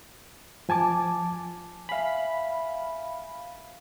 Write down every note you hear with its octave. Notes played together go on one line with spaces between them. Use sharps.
F3 G#5 A5 D6
E5 F5 G#5 B5